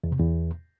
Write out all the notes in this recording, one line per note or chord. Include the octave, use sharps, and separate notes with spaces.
E2
C3
E2